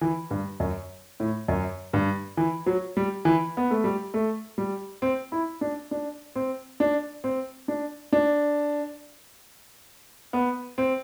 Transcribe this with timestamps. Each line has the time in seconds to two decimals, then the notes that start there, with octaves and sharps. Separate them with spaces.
0.01 E3
0.31 G2
0.60 F#2
1.20 A2
1.48 F#2
1.93 G2
2.37 E3
2.66 F#3
2.97 G3
3.25 E3
3.57 B3
3.71 A3
3.84 G3
4.14 A3
4.58 G3
5.02 C4
5.32 E4
5.61 D4
5.91 D4
6.36 C4
6.80 D4
7.24 C4
7.68 D4
8.13 D4
10.33 B3
10.78 C4